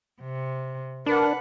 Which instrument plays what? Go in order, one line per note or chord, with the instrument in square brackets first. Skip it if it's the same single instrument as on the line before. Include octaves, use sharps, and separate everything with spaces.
[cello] C3
[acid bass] D4 [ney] A#4 [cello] B4 F#5